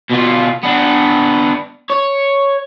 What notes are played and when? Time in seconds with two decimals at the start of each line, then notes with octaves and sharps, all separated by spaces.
0.10 B2 F4
0.64 B3 D4
1.90 C#5